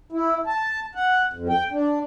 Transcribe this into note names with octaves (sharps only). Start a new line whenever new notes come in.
E4
A5
F#5
F2
G5
D4